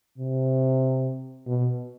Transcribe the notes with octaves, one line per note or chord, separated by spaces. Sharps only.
C3
B2